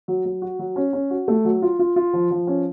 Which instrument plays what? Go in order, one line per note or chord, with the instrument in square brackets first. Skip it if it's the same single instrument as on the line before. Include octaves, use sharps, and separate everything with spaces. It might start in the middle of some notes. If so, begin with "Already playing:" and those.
[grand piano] F#3
F#3
F#4
F#3
C#4
C#4
F#4
A3
F#3
F4
F4
F4
F3
F3
C#4